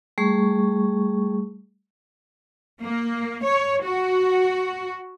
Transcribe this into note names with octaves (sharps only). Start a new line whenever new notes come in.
G3 A3 G#4 C#6
A#3
C#5
F#4